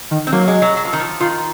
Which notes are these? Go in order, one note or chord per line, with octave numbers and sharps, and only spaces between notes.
D#3
C4
F#3 A#3
G#3
F#3
F#3
F3
D#3
F3
D#3 F4